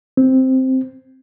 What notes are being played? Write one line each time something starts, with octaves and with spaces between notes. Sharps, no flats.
C4